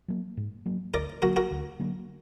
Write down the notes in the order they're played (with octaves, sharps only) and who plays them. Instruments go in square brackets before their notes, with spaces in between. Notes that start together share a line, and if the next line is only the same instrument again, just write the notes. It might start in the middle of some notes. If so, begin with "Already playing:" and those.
[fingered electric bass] F#3 A#3
G#2
F#3 A#3
[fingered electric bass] D2 [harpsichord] A#4 D5
[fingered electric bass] D3 F#3 A#3 [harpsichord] F#4 A#4
[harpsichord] F#4 A#4
[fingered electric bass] D2
D3 F#3 A#3